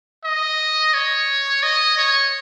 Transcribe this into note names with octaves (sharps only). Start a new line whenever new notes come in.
D#5
C#5
D#5
C#5